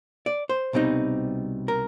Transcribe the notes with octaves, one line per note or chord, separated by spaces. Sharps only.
D5
C5
C2 B2 G3 C4 D#4
A#4